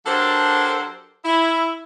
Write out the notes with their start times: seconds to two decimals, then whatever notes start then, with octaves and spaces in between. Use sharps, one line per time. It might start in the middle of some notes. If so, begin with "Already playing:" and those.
0.06 F#3 D4 G4 A4 A#4 C5
1.25 E4